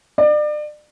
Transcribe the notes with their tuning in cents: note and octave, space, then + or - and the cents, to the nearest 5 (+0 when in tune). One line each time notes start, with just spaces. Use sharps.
D5 +35